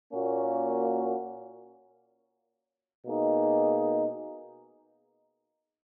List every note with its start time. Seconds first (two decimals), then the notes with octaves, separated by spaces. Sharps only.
0.13 A#2 A#3 C#4 F#4
3.04 B2 A#3 D#4 G#4